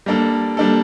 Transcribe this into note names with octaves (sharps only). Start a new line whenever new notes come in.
G3 A#3 D4 A4
G3 A#3 D4 A4